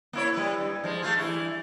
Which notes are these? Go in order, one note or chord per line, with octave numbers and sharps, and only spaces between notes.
A#3 E4 C#5
G3 B4
G2
F3 G#3
A3 F4 G#4
G2 E3 E4